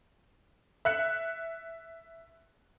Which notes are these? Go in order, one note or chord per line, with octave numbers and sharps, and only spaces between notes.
E5 F#6 C#7